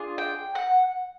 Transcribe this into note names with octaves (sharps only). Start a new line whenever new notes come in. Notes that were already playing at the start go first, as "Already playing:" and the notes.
Already playing: D4 F4 G#4
G5
F#5